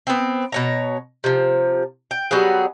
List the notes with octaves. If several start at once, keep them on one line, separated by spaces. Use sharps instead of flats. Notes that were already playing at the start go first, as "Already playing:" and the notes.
B3 C4
B2 C#5 A#5
C3 F3
G5
F#3 G3 B3 G#4